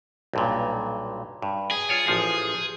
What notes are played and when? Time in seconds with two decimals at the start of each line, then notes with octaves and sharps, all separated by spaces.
0.33 B1 G2 A#2
1.42 G2
1.71 G#4
1.89 F4 C#5 D5
2.07 A1 F3 F5